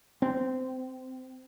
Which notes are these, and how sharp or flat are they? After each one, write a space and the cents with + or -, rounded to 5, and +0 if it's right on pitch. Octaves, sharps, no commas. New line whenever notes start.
C4 -20